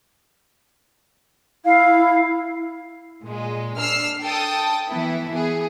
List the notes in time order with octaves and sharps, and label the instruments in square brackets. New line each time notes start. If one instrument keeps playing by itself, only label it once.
[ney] E4 [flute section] F5
[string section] A#2 G#3
D4 E6 F6 C7
A4 G5 A5 D#6
E3 B3 E4
B3 G#4